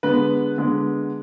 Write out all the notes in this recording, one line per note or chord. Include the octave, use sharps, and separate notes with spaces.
D3 G#3 B3 B4
D3 G#3 B3